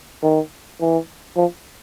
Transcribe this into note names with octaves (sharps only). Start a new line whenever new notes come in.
D#3
E3
F3